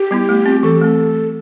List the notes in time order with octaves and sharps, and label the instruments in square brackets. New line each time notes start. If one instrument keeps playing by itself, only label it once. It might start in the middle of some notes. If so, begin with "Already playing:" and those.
Already playing: [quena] G4
[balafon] G3 B3 E4
A3
C4 F4
[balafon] E3 [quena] A4
[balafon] A3 C4